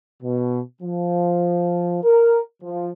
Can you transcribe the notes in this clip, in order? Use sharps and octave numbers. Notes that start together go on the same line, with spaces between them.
B2
F3
A#4
F3